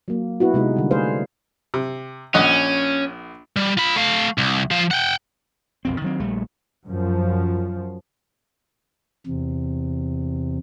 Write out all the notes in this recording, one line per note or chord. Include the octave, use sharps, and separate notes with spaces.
F#3 A#3
B3 E4 F#4
C3 G#3 D#4
D3 G3
A3 G#4 B4 C5 F5
C3
A#1 C#4 D#5 F#5
G3
F4 B5
A3 F5
C2
F3 F5
F#5 G5
B1 F2 C4
D#3 F#3 C4
A#1 G3 A3
F#2 F3
E2 C3